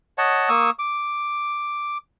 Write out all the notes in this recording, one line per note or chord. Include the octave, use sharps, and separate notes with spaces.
C#5 D#5 F#5 A5
A#3 C#6 D#6 E6
D6